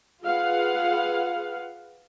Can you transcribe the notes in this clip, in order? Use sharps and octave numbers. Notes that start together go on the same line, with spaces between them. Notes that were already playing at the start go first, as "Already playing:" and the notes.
F4 G#4 B4 F5 F#5